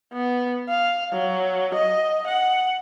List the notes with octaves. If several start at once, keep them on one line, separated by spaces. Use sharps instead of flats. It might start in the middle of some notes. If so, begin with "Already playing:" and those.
B3
F5
F#3
D#5
F#5